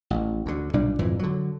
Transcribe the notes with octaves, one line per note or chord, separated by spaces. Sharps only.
A1
D2 D3
B1 A#2 G3 D4
G#1 F2 A#2 E3
D3 F#3